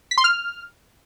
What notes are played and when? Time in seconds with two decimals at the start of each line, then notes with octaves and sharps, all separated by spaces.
0.11 B6
0.18 C6
0.24 F6